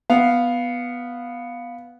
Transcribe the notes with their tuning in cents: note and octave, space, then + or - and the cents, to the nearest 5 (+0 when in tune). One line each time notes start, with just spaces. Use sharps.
B3 +0 F5 +5